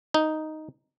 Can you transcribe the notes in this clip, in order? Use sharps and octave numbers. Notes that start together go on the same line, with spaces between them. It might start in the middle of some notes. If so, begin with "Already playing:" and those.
D#4